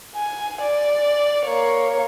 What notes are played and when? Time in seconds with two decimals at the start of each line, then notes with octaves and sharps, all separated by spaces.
0.16 G#5
0.62 D5
1.45 A#3 C#5